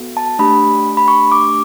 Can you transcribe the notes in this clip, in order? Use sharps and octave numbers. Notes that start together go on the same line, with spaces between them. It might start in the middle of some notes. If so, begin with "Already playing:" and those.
Already playing: B3 F#4 A4
A5
A3 D4 G4 B5
B5
C#6
D6